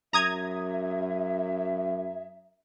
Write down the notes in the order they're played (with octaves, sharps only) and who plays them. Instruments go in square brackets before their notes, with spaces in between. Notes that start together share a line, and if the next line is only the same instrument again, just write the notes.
[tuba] F#2 [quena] E5 [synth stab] A#5 D#6 G#6